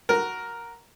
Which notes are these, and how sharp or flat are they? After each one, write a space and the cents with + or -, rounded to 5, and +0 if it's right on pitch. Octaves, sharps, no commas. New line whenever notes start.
F#4 +0 A#4 +0